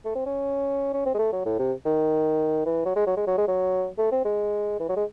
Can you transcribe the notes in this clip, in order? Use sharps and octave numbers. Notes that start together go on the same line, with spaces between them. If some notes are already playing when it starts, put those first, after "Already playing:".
A3
C4
C#4
C#4
C4
G#3
A3
F#3
A2
C3
D#3
E3
F#3
G#3
F#3
G#3
F#3
G#3
F#3
A3
C4
G#3
E3
F#3
G#3